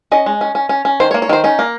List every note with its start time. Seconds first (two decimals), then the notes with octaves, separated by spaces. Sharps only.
0.12 C#4 D#5
0.26 G#3
0.41 C#4
0.55 C#4
0.69 C#4
0.85 C#4
1.00 D#3 C5
1.11 C#5
1.14 A#3
1.22 C#5
1.29 D#3 C5
1.44 C#4 D#4
1.59 A#3